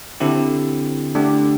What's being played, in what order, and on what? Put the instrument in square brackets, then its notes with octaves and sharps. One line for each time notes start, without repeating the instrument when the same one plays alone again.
[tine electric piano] D3 C4 E4 G4
D3 A3 D4 G4